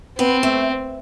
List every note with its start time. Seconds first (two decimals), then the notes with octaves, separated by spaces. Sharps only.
0.19 B3 C4
0.43 A3